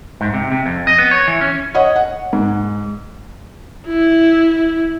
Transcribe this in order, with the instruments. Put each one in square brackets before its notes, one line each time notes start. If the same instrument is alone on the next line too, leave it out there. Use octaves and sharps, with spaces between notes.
[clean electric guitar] G#2
C3
C3
F2
D#5
B3
C#5
E3
C#4
[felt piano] C#5 D#5 F#5
F#5
G#2
[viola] E4